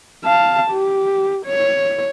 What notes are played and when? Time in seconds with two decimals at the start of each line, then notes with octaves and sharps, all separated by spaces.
0.24 F5 A5
0.71 G4
1.46 C#5